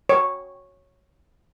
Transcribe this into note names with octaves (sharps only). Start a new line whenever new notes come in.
C#5